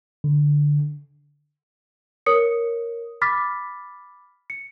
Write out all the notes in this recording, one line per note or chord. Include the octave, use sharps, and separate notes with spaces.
D3
A#4 C#5 D#6 C#7
B5 D6 F6 A6 B6
C#7